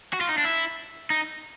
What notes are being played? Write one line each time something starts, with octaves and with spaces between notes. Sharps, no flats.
F#4
F4
D#4
D4
E4
D#4